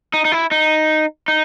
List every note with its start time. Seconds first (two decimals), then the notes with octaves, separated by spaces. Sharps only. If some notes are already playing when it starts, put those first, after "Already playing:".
0.14 D#4
0.25 D#4
0.32 E4
0.51 D#4
1.28 D#4